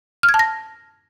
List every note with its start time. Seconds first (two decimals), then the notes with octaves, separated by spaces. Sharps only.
0.23 F6
0.29 G#6
0.34 A5
0.39 A#6